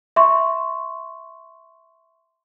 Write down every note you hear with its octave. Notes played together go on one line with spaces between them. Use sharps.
E5 C6 C#6